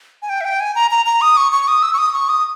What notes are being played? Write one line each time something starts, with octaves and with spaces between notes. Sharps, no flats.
G#5
G5
E5
G5
G#5
A#5
A#5
A#5
D#6
C#6
C#6
D#6
E6
C#6
D#6
C#6
D#6